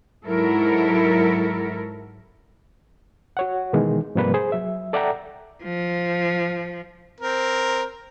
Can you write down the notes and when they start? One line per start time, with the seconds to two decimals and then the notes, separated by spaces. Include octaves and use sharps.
0.24 G#2 F#3 E4 A4 A#4
3.37 F#4 C#5 F#5
3.73 B2 D#3 E3 G#3
4.15 G#2 C3 F3 G3 A#3 B4
4.34 G#4 C5
4.52 F#3 E5
4.93 A4 D5 E5 F#5 G5 A#5
5.64 F3
7.20 C4 A#4